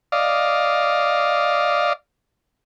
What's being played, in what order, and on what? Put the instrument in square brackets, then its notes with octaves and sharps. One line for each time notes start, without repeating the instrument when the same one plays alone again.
[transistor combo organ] D5 D#5 F5